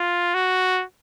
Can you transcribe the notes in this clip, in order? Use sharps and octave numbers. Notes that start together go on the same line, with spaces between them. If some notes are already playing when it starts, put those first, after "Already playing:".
Already playing: F4
F#4